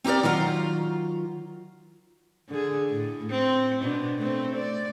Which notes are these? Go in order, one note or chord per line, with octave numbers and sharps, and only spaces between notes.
C4 D#4 G4 A#4 D5
D#3 F#3 F4 A#5
D3 G#4
A2
C4
B2 D4
A3 C4
D5